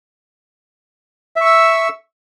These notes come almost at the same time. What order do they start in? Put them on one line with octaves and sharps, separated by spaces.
E5 C#6 E6